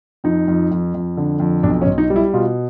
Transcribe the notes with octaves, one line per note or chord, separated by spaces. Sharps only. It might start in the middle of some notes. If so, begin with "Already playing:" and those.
F2 D#4
F2
F2
F2
D3
F2
B1 D4
C#4
B1
D#4
G3
E4
B2 F4